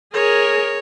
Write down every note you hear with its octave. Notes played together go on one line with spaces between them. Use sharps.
G#4 A#4 C#5